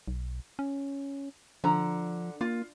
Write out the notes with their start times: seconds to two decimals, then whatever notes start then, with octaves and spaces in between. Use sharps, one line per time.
0.08 B1
0.59 C#4
1.64 D3 F3 A#5
2.41 A#3 F4